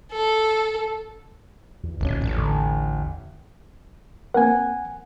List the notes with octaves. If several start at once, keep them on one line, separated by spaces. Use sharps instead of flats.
A4
E2
D1 G#1 A#2 C#4
A1
E2 A2 D3
A#3 C4 A#4 F#5 G#5